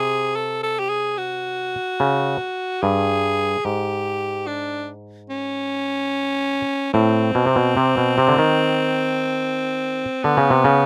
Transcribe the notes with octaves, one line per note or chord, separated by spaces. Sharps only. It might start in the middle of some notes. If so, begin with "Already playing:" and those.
Already playing: C3 G#4
A4
A4
G4
G#4
F#4
C#3
G2 G#4
G#2 G4
D4
C#4
A2 C4
B2
C3
B2
C3
B2
C3
D3
D#3
D3 B3
C#3
C3
C#3